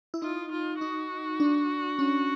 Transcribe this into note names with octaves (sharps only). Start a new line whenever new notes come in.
E4
D#4 F4
F4
D#4 F#4
D4
C#4